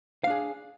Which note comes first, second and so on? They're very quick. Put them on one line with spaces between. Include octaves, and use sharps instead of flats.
F5 D4 G#4